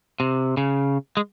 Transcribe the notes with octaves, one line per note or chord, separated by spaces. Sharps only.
C3
C#3
G#3